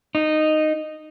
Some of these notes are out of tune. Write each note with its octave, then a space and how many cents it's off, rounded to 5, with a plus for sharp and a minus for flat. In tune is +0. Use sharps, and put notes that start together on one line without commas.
D#4 -10